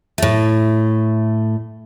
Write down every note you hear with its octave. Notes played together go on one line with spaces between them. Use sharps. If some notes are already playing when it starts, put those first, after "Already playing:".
A2 A3